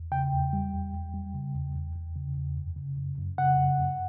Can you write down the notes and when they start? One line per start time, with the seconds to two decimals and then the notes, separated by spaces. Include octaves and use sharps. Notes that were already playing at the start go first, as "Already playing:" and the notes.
Already playing: E2
0.12 C#3 G5
0.33 E2
0.53 G3
0.73 E2
0.93 E2
1.14 G3
1.35 C#3
1.55 E2
1.75 E2
1.96 E2
2.16 C#3
2.37 E2
2.57 F#2
2.77 C#3
2.98 F#2
3.18 F#2
3.38 C#3 F#5
3.58 F#2
3.80 F#2